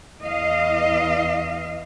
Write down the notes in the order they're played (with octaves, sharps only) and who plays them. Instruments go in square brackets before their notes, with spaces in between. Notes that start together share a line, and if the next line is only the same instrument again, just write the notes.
[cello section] E2 D#5 F5